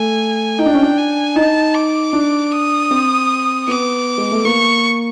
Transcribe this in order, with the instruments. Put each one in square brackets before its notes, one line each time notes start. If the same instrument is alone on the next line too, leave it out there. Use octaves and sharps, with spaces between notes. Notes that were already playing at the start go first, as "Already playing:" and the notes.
Already playing: [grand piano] A3 [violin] G#5
[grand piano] D#4 [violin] G5
[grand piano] D4
C#4
D4
[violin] G#5
[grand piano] D#4 [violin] A5
[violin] D6
[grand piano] D4
[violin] D#6
[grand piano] C4
[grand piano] B3 [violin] D6
[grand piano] G#3
A3
[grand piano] A#3 [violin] C#6